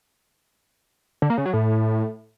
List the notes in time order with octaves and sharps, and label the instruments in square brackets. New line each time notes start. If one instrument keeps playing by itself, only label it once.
[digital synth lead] D3
A#3
C#3
F#3
A2